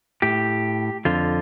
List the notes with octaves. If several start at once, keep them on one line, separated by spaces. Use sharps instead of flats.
A2 G4
F2 D3 F4